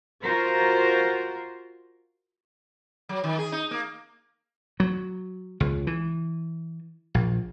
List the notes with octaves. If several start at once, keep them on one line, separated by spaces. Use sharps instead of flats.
F4 F#4 A#4 C5
F#3
D#3
G#4
D#4
A#3
F#3
C#2
E3
A#1